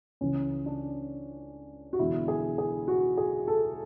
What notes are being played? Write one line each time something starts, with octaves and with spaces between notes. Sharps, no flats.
C#2 C#3 E3 C#4
D4
F#4
E1 E2 D3 E4
G#4
G#4
F#4
G#4
A4